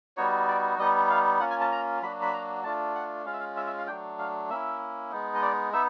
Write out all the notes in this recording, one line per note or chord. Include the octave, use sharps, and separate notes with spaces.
G3 B3 D#4 F#4 C#5
D5
G3 B3 D#4 D#5
F5
A#3 C#4 F4 F#5
G#5
A5
A#5
F#3 A#3 D4 F#4 B5
B5
A#5
A3 D4 F4 A5
F#5
G#3 C#4 F4 F5
E5
F5
E5
E5
F5
F#3 A3 D4 G5
F5
A#3 C#4 E4 E5
G#3 B3 D#4
D#5
D5
B3 D#4 E5